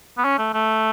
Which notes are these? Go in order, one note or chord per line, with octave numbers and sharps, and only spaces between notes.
B3
C#4
A3
A3